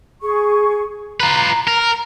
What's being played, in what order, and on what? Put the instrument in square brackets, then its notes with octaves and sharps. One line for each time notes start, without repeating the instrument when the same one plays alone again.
[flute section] G#4 C#6
[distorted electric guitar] F4 B4 [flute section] A#5
[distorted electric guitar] A#4